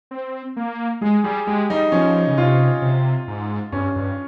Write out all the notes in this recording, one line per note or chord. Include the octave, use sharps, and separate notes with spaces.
C4
A#3
G#3 G#4
G3 G#4
G#3 G4
G3 D#4
F3 C#4
C#3
C3 F4
C3
G#2
G2 C#4
G2